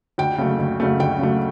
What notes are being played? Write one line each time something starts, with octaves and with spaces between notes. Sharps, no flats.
D2 G5
C#3 F#3 A3
D2
C#3 F#3 A3
D2 G5
C#3 F#3 A3